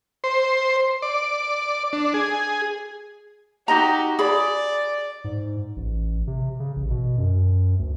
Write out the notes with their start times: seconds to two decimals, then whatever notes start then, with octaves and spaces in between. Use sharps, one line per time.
0.24 C5
1.02 D5
1.93 D4
2.14 G#4
3.68 D#4 F#4 G4 D#5 A#5
4.19 G#4 D5 B5
5.24 G#2
5.76 A1
6.27 C3
6.60 C#3
6.76 A1
6.90 B2
7.18 F#2
7.79 D2